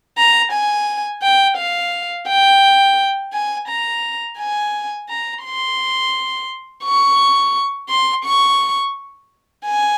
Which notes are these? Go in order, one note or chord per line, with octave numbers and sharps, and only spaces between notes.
A#5
G#5
G5
F5
G5
G#5
A#5
G#5
A#5
C6
C#6
C6
C#6
G#5